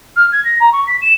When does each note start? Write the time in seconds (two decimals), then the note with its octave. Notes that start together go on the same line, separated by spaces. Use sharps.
0.16 F6
0.32 G#6
0.45 A#6
0.60 A#5
0.72 C#6
0.87 B6
1.02 E7